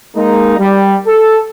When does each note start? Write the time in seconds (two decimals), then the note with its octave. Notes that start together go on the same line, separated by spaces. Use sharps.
0.16 G#3 A#3 D#4
0.59 G3
1.07 A4